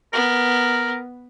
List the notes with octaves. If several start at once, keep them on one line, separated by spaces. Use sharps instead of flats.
B3 A#4